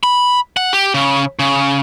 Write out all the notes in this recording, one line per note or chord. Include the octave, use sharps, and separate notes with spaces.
B5
F#5
G4
C#3
C#3